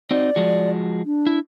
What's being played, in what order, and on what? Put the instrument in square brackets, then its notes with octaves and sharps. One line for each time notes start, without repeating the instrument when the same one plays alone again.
[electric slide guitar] C4 D#4 F#4 [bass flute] D5
[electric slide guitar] F3 G#3 F#4
[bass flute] D4
[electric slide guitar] E4